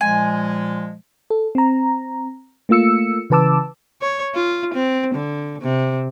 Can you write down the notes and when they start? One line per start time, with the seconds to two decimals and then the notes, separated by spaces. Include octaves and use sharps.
0.01 A#2 F3 G#3 G#5
1.30 A4
1.55 C4 A#5
2.69 A3 A#3 F4 E6 C#7
3.30 C#3 E3 B4 A5 D6 E6
4.02 C#5
4.35 F4
4.74 C4
5.14 D3
5.61 C3